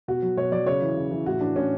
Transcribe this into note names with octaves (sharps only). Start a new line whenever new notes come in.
B2 F#4
F#3
B2 C#5
F#3 D5
C#3 C#5
E3
C#3
E3
A2 F#4
E3 D4
A2 C#4